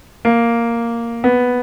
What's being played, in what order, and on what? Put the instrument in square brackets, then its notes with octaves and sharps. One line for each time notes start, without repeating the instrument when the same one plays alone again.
[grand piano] A#3
B3